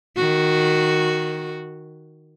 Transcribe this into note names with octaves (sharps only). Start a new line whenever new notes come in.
D#3 F#4